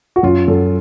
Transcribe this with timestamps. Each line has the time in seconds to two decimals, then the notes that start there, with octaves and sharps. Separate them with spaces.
0.16 F#4
0.23 F#2 F4
0.48 F#2 A4